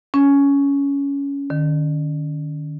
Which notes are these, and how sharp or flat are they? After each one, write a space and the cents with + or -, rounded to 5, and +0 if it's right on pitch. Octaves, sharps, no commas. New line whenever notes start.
C#4 +15
D#3 -40